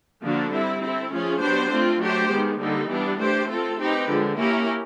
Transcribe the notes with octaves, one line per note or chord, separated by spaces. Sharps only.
D3 F3 A#3 D4 F#4
G3 C4 E4
C4 E4 A4
F3 A3 C#4 F4 G#4
F#3 B3 D4 G4 C5
A3 C4 F4
F#3 A3 D4 G4 C5
D#3 G#3 B3
D3 G3 A#3 D#4
E3 G3 B3 D4
A3 D4 G4 C5
C4 F4 A4
C4 D#4 G4 B4
D3 F3 G#3
A#3 C#4 E4 G4 A#4